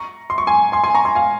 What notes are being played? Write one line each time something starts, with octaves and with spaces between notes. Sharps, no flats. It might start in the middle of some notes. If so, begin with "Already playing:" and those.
Already playing: A#5 C#6
C6
C#6
G#5 C6
G#5 C6
G#5 C6
A#5 C#6
G#5 C6
F5 G#5